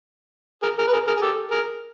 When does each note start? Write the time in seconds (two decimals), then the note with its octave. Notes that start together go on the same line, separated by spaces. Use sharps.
0.62 G#4 A#4
0.78 G#4 A#4
0.87 B4
0.93 G#4 A#4
1.07 G#4 A#4
1.17 G#4
1.22 G4 A4
1.51 G#4 A#4